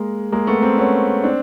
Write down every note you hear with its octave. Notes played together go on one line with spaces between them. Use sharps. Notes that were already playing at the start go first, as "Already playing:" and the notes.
Already playing: G#3 A#3
G#3 A#3
A3 B3
A#3 C4
B3 C#4
C4 D4